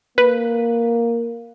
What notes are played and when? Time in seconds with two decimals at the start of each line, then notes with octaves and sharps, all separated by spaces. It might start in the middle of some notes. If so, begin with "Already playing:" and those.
0.18 A#3 B4